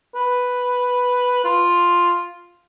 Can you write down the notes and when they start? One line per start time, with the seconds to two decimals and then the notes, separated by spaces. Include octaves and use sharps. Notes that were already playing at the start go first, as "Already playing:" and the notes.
0.15 B4
1.45 F4